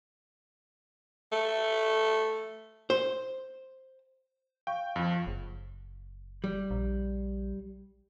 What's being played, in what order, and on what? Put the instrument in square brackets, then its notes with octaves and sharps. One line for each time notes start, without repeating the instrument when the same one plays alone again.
[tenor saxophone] A3
[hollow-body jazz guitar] C5
[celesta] F5 C#6 [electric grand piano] G5
[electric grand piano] F2 F3
[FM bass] F#1
[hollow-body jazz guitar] G3
[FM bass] A#1